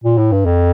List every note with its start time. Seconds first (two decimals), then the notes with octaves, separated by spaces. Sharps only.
0.04 A#2
0.18 A2
0.32 G2
0.46 F2